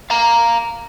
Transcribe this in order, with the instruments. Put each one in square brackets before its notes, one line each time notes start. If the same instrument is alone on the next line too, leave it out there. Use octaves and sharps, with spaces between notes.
[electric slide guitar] F5 A#5